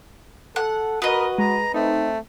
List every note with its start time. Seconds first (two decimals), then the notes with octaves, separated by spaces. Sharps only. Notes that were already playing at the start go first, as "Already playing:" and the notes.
0.56 A4 F#5
1.02 F#4 A#4 B4 D#5 D#6
1.38 G#3 A#5
1.74 A3 C4 D#4